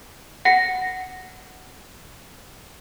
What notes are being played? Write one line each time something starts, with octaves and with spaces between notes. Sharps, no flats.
F#5 A#6 C#7